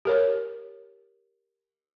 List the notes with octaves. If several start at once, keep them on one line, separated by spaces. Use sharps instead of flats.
G4 A#4 C#5